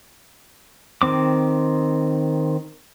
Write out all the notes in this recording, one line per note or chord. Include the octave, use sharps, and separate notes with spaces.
D#3 C4 D6